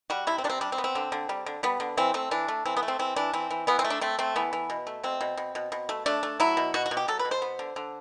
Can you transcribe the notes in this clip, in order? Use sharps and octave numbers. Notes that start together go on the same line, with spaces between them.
G3 F#4
C3 E4
C4
C3 D4
C4
G3 D4
C4
B3
C4
D3
D3
G3
D3
G3 B3
D3
E3 C4
A3 C4
E3 D4
A3
E3 C4
B3
A3
C4
E3 C4
E3 D4
E3 C4
E3
E3 B3
C4
A3
D4
A3 C4
A3 C4
E3 B3
E3
B2
A3
B2 C4
B2
B2
B2
B2
A3
A3 D4
A3
F#3 E4
B2
B2 F#4
F#4
B2
G4
F#3 A4
B4
B2
C5
B3
D3
D3